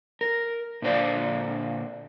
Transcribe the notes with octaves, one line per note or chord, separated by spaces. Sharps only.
A#4
A#2 D3 C5 D5 F5